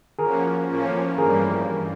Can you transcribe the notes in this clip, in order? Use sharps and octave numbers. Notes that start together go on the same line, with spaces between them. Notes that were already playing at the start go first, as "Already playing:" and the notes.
F3 A#3 C#4 F#4 G#4 A#4
A2 F3 A#3 C#4
G2 E3 G3 A#3 G#4 A#4